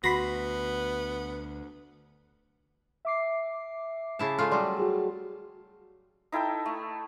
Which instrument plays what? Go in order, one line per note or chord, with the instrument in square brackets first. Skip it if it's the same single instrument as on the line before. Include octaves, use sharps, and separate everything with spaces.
[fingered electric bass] D2 [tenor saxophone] B3 [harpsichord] F#4 [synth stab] B5 C6 A#6
[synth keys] E5 D6 C7
[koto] C#3 E4 A5
G#3 A3 F4
[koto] F#3 G3 [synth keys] D5 C6
[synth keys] F#4 G#4
[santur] D#4 E4 A4 G5
A3